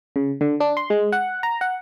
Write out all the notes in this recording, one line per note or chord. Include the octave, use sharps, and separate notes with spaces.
C#3
D3
D4
C6
G#3
F#5
A#5
F#5